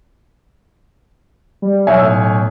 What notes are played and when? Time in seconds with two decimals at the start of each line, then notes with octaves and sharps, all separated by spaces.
1.62 G3
1.87 B1 C#5 E5 G#5
2.02 A2